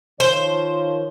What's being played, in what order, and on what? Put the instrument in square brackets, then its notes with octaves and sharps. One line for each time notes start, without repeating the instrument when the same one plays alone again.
[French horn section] D#3 F3 C#5 [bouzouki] C5